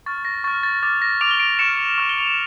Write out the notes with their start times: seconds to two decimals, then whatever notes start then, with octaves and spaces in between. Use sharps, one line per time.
0.06 C#6 F6 A6
0.25 A#6
0.44 C#6 A6
0.48 F6
0.63 A6
0.83 D6 F6 A6
1.02 A#6
1.21 D6 F6 D7 F7
1.31 G7
1.40 D7 F7
1.59 C#6 F6 C#7 E7
1.98 C#6 F6
2.09 G7
2.18 F7
2.27 E7